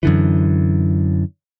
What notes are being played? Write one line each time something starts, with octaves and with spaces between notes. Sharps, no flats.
F#2 D3 E3